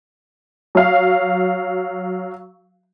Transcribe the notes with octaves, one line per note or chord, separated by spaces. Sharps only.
F#3 F5